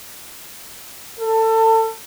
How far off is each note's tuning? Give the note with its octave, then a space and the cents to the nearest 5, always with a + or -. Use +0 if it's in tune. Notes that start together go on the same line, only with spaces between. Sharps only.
A4 +25